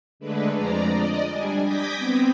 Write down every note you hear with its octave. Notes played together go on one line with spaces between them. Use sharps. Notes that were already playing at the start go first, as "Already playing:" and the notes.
D3 G#3 A3 D4 B4
F2 F3 G#3 D5 A#5
D5 D#5
G3 D4 G#5
D6 D#6 G6 G#6 A#6 B6
B3 C4